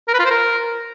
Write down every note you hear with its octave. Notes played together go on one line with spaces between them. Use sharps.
A#4
B4
F4
C5
A#4